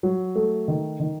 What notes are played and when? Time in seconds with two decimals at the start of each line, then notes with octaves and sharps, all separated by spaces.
0.03 F#3
0.35 A3
0.68 D#3
1.00 D#3